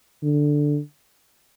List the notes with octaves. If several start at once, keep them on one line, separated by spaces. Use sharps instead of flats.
D3